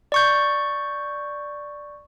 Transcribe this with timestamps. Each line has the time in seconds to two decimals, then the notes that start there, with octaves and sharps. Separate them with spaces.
0.12 D5 C#6 G6